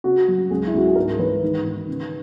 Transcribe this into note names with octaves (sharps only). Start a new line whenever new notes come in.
C#3 F#4
F#3
C#2 G#4
E4
C#2 F#4
G#4
G#2 A#4
E3 B4
D#3
D#3
C#3